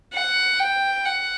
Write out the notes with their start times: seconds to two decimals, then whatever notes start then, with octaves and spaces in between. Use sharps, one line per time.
0.14 F#5
0.59 G5
1.05 F#5